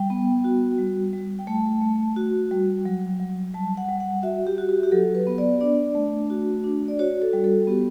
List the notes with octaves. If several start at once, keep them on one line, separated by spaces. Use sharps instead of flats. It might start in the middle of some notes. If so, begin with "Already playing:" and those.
Already playing: G3 G5
B3
F#4
G3
G3
G5
A3 A5
A3
F#4
G3
F#3
F#3
G3 A5
F#5
G3
F#5
F#4 E5
G4
F#4
G4
G4
F#3 A4
B4
B3
D5
D4 D5
A3
F#4
D4
D5
F#4 C#5
A4
G3
A4
B3 G4